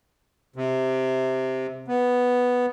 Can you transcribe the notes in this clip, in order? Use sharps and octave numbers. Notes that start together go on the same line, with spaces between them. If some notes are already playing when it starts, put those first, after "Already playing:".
C3
B3